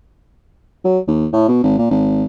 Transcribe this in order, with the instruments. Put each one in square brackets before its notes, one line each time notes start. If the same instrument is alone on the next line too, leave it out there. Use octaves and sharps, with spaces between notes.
[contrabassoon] F#3
D#2
A2
B2
G#1
A#2
G#1